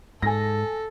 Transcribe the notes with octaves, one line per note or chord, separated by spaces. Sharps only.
G#2 A4 G#5 A#6